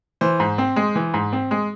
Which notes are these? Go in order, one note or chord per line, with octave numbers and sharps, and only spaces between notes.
E3 C5
G#2
C4
G#3
E3
G#2
C4
G#3